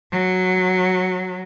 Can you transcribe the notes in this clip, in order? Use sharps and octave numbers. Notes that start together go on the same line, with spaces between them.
F#3